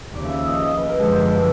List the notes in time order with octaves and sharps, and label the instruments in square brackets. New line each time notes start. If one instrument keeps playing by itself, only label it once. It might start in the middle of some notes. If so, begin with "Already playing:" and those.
[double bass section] D#2 C#3 F3 [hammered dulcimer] D5
[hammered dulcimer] E5
E5
D#5
D#5
D#5
B4
A#4
[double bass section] F#2 D3 F3 G#3 [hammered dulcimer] A4
[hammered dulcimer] C5
B4
A#4
A4